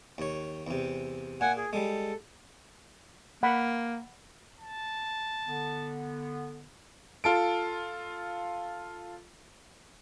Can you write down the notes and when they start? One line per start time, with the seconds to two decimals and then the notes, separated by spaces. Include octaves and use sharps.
0.18 D#2 C#5
0.67 E2 C3
1.41 A#2 F#5 G#5
1.57 G#4
1.73 G3 G#3 A4
3.43 A#3 F#5 B5
4.59 A5
5.47 D3 B3
7.24 F4 A4 D7